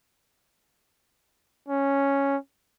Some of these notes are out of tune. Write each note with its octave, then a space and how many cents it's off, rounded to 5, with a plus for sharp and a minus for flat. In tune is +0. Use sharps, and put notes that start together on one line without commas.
C#4 +0